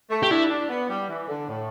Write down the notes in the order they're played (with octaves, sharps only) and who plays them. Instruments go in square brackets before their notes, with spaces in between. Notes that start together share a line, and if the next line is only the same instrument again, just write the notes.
[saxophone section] A3
[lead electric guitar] G4
[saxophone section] D4 [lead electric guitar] E4
[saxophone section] D4
B3
G3
E3
D3
A2